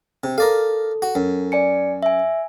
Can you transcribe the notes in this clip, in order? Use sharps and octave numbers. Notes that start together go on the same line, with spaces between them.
C3
A4 A#4 D5 F5
F#4
F#2
D5 G#5 C#7
E5 G#5